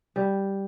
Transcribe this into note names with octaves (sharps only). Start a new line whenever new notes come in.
G3